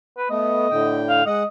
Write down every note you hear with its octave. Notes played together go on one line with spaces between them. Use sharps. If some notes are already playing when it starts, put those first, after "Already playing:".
B4
A3 B3 D#5
A2 D3 G5
F5
G#3 D#5 F#5